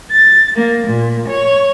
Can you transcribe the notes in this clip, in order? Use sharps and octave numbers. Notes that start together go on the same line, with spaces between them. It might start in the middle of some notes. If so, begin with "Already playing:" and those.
A6
A#3
A#2
C#5